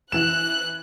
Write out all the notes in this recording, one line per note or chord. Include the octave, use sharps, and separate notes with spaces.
E3 F#6 E7